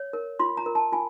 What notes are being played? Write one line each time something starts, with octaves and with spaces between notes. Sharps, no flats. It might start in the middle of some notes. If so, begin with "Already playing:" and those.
Already playing: C#5
A#4
F4 C6
A#5
A#4
A5
F4 G#5